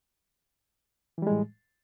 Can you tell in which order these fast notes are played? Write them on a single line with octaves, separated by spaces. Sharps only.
E3 G3 G#3 A2